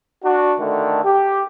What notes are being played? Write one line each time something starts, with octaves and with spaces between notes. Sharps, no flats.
D4 F#4
D3 D#3 A3
G4